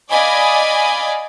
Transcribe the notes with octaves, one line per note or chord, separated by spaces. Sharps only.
D5 D#5 F5 G#5 B5